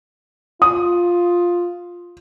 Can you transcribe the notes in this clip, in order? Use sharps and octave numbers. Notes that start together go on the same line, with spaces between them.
F4 D#6